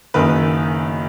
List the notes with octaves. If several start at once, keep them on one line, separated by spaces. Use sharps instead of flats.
F#1 F#2 D#3 B4